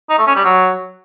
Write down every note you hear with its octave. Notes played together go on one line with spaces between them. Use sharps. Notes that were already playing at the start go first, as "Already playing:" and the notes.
D#4
A3
C#4
G3
F#3